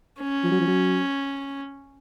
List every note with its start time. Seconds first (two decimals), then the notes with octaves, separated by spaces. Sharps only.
0.20 C#4
0.43 F3
0.51 F#3
0.60 F3
0.67 F#3